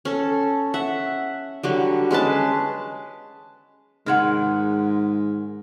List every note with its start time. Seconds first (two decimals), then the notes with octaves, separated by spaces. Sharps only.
0.05 C#4 A4
0.74 E5 F#5
1.63 D3 F#3 G3
2.11 G#3 C#4 B4 A5
4.06 G#2 D#3 G#3 F#5